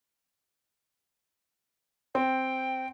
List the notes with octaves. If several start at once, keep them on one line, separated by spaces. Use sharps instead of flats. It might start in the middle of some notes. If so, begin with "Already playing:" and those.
C4 G5